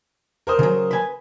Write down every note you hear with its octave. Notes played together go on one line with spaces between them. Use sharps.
A#4 C5 D#6
C#3 F#3
B4 G#5